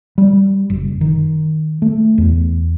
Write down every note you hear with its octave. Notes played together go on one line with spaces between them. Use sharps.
G3
F#1
D#3
A3
E2